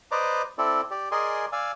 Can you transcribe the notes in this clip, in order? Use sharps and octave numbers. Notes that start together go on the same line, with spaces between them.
B4 C5 D5 D#5 A#5 D6
C4 E4 A4 D5
G4 D5
G#4 A#4 D5 D#5 G#5 C6
D5 F5 G#5 E6